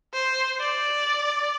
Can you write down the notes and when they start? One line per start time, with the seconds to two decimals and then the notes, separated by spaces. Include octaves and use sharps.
0.14 C5
0.60 D5